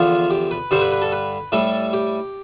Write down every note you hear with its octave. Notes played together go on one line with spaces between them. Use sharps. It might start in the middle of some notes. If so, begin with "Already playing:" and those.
Already playing: E2 D3 F3 F4
G4
B4
G2 D3 G3 C5
B4
B4
A4
B4
A2 G3 A4
G4